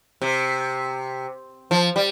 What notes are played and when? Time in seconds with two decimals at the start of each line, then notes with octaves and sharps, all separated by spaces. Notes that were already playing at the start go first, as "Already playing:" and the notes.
0.22 C3
1.71 F3
1.96 G3